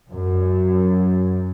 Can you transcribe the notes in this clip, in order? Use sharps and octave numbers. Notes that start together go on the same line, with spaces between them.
F#2